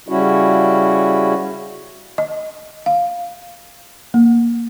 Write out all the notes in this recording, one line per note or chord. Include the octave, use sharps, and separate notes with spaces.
C#3 G3 C#4 E4 F#4
D#5
F5
A#3